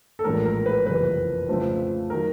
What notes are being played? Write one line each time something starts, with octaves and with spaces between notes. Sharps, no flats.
A4
A#1 A2 E3 G#3 A#4
A#4
B4
F#1 F2 C3 E3 B4
F2 C#3 F3 A3 C4
D#3 F#3 A#4